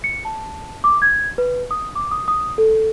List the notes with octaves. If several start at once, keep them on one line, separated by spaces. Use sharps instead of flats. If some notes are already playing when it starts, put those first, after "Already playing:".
C#7
A5
D6
G#6
B4
D#6
D6
D#6
D#6
A4